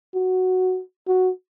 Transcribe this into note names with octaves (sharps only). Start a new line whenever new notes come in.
F#4
F#4